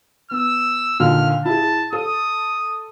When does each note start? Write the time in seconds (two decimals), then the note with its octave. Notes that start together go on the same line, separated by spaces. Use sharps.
0.31 B3 E6
1.00 A#2 D3 D#3 F6
1.45 E4 G#4 A5
1.93 A4 D#6